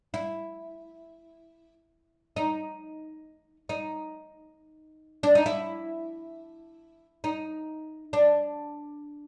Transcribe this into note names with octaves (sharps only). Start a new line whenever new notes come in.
E4
D#4
D#4
D4
D#4
E4
D#4
D4